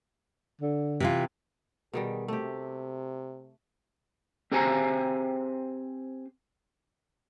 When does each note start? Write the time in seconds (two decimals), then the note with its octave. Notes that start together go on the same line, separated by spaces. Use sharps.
0.61 D3
1.00 C3 E3 F4
1.93 B2 D#3 G3 G#4
2.28 C3 A3 G4
4.52 C4 G4 G#4 C5 G#5 A#5